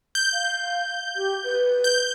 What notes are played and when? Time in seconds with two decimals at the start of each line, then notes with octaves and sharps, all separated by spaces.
0.15 G6
0.33 F5
1.16 G4
1.44 B4
1.84 G6